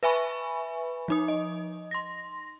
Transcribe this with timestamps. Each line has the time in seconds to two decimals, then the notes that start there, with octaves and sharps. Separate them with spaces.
0.03 B4 E5 G#5 B5 C#6
1.08 F3 D#4 D#6
1.28 D#5
1.91 C6 A#6